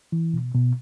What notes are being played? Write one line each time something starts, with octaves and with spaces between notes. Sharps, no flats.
E3
B2
B2